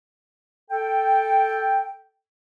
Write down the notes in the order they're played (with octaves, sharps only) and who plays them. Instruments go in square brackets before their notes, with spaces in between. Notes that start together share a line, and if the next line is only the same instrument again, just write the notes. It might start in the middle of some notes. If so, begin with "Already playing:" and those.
[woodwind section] A4 G5